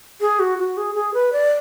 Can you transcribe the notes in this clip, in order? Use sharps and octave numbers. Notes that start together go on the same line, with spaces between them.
G#4
F#4
F#4
G#4
G#4
B4
D5